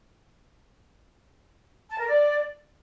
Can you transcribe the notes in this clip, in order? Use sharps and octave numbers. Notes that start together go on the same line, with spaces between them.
A5
A#4
D5